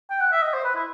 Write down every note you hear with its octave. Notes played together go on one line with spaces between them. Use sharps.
G5
F#5
E5
D#5
C5
B4
E4